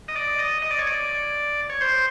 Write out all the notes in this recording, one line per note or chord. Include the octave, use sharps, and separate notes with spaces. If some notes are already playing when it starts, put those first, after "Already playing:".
D#5
D5
D#5
D#5
D5
C#5
D5
C#5
C5